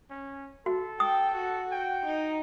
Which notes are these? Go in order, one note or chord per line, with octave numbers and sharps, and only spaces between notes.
C#4
F#4 A4
G5 D#6
F#4
G5
D#4